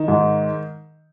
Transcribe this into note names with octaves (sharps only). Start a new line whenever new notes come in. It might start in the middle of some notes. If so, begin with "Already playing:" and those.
Already playing: D#3
G#2